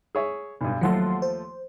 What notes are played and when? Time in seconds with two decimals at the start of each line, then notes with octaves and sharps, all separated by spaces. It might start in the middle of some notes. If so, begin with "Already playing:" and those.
0.15 G#4 C#5 E5
0.61 B1 G2
0.81 D#2 F3 F#3 A3 F#5 C6
1.22 C5